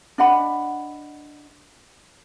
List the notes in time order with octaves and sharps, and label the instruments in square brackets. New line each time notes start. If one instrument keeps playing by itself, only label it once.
[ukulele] D4 D#5 F#5 B5